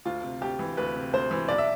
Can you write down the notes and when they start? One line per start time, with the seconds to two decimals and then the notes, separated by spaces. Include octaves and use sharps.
0.05 D2 F4
0.23 C3
0.41 D2 G4
0.59 E3
0.77 D2 B4
0.96 C3
1.13 D2 C5
1.31 E3
1.49 B1 D5
1.58 E5